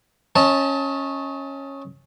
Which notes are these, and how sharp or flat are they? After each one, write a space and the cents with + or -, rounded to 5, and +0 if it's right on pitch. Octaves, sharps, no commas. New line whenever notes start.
C#4 -10 D#5 +30 A5 +0